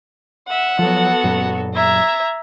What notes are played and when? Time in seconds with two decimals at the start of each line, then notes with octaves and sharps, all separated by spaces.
0.48 E5 F#5
0.79 F3 F#3 B3 F#4 A4
1.24 F#2 A#2 F#3
1.74 E5 A#5 G#6